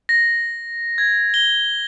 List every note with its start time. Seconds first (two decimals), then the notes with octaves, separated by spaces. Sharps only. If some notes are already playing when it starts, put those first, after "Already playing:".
0.09 A#6
0.98 G#6
1.34 G7